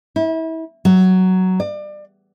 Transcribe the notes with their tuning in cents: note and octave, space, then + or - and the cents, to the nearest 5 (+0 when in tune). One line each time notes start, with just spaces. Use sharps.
E4 -30
F#3 +10
D5 +30